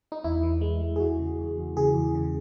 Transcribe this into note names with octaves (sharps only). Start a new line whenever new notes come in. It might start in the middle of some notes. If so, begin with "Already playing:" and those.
D#4
E2 E4
E3
G#3
G#3
G#4
E2 F#4
C#3
E2
E2
C#3 G#4
E2
C#3